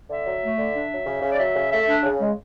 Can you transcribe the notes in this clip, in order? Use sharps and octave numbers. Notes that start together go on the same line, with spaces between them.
D3 E5
F#3
A3
D3
D4
F#3
C#3
C#3
D5
F#3 E5
C#3
A3 E5
D4
C#3
G#3